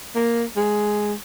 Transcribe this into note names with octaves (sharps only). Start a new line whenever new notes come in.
A#3
G#3